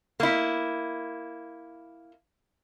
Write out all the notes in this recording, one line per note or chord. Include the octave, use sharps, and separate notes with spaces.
A#3 E4